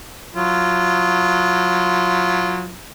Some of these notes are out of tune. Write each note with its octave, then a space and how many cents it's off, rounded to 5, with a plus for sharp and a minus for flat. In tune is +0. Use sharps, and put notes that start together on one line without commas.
F#3 -30 F4 -25